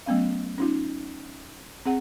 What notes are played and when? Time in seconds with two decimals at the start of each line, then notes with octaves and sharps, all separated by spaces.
0.06 F#3 A3 B3 C#4 F5
0.58 C#4 D#4 F4
1.86 C4 G#4 F#5